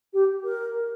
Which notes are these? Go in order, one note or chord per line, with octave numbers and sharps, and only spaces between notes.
G4
A#4